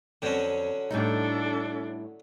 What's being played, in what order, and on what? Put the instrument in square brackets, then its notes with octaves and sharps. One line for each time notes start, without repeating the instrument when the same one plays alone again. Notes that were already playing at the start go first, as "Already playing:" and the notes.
[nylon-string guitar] F2 C4 [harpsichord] D3 F#3 C#4
[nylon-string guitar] A2 G3 D#4 [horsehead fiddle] D4 A4